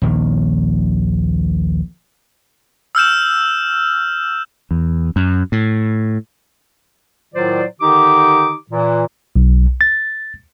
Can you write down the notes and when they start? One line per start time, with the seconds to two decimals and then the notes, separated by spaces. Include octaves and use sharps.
0.02 A#1 D#2 D#3
2.95 E6 F6 G6 E7
4.71 E2
5.16 F#2
5.52 A2
7.35 A2 D#3 F#3 F4 C5 D5
7.81 D3 D#3 D#4 G4 D6
8.71 A#2 E3
9.36 B1
9.81 A6